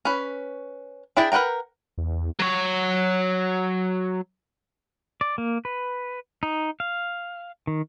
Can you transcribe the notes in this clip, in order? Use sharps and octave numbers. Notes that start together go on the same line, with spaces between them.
C#4 B4
D4 E4 G#4 G5 A5
A#4 B4 F#5 G5 A#5
E2
F#3 C#5
D5
A#3
B4
D#4
F5
D#3